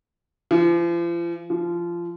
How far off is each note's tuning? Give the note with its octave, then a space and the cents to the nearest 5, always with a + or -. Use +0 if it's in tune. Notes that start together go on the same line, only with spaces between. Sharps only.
F3 -40
F3 -20